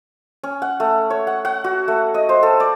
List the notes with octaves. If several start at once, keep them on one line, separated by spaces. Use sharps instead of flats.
C#4
F#5
A3
C#5
F#5
F#5
F#4
A3
D#5
C5
A4
D5